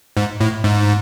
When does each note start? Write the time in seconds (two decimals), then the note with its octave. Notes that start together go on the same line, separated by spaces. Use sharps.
0.17 G#2
0.40 A2
0.64 G#2